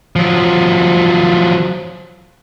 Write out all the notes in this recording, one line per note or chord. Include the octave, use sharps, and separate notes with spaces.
F3 F#3